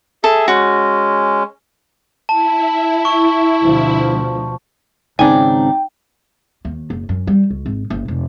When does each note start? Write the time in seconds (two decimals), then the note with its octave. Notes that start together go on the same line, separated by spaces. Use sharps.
0.24 G#4 A4 E5
0.48 G#3 C#4 F#4
2.29 E4 A5
3.05 C#6
3.62 D2 B2 F3
5.19 G#1 C#3 C4 D4 D#4 G5 G#5
6.65 D#2
6.90 F#1
7.09 F#2
7.27 G3
7.50 C#2
7.66 G#1
7.90 F#1
8.08 F1